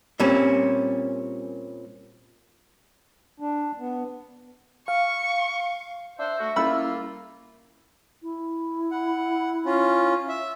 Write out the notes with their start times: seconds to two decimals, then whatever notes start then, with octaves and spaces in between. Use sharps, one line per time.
0.20 A#2 G3 C4 C#4
3.40 D4
3.80 B3
4.88 F5 C#6
6.19 D4 C5 E5
6.39 A3 F#4
6.56 G3 A#3 C#4 E4 F4 B5 E6
8.22 E4
8.91 F#5
9.65 C#4 F4
10.28 E5